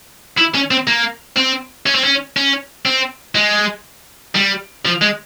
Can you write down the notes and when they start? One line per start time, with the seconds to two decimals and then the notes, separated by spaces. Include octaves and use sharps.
0.38 E4
0.55 C#4
0.71 C4
0.87 A#3
1.37 C4
1.86 C#4
1.95 C4
2.04 C#4
2.37 C#4
2.86 C4
3.35 G#3
4.35 G3
4.85 F3
5.01 G#3